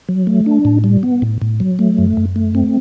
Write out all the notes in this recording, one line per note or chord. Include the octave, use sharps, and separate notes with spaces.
F#3
A3
D4
A2
G3
B3
A2
A2
F#3
A3
F#2
F#2
A3
C4